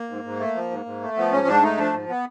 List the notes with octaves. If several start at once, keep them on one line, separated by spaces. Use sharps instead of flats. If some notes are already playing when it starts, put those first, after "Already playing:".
Already playing: A#3
G#2
G#2
A3
F3
G#2
G#2
A3
F3 B3
G#2 C#4
G#2 D4
A3 D#4
F3 D4
G#2
B3